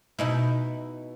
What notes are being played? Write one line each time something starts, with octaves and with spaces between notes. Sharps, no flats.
B2 D#4 E4